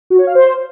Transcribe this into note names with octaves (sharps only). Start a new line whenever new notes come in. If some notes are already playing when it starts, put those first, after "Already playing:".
F#4
C#5
F5
C5